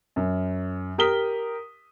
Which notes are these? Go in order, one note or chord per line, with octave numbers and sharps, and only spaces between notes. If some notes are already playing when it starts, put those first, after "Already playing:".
F#2
G4 A#4 D#6 B6 G7